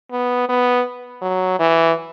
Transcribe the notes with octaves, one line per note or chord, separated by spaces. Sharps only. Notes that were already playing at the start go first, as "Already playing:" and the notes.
B3
B3
F#3
E3